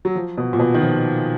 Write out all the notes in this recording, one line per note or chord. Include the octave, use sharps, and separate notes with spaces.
F#3
F3
B2
A#2
B2
D#3
F3